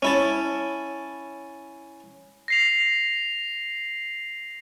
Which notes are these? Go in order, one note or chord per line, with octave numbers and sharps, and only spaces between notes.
C#4 E4 A5
A#6 C7 F7